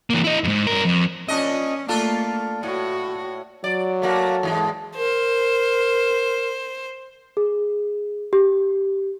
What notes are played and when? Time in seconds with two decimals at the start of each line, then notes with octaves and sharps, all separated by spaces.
0.10 E3 A#3
0.24 E4 D#5
0.44 F2 G#2
0.67 G2 A#4
0.85 F2
1.28 A#2 C#4 D4 D#5
1.88 A3 A#3 D4 F4 A4
2.63 A2 F#4
3.64 F#3 D5
4.02 A3 A#3 F#4
4.43 E2 G#2 G#3
4.97 A#4 C5
7.37 G#4
8.33 G4